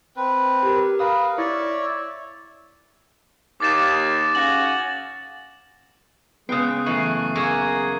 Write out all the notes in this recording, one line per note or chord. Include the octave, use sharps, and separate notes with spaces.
C4 B4
G4 A#4
A#4 B4 F5 D#6
E4 C#5 D5 E5
D#2 D6 A6 E7
C#3 C#4 F#4 F#7
C#3 G#3 B3 G5 D#6 F#6 C7
F#2 E3 A3 C#6 C7
A#3 F#4 G#4 E5 C#6 G#6